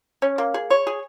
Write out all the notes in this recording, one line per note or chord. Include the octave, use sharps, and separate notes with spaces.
C#4
A#3
G#4
C#5
G#4